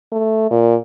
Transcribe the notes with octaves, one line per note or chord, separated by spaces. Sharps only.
A3
A#2